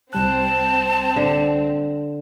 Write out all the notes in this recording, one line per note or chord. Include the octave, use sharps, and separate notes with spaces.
C2 G3 C4 A5 F#6
D3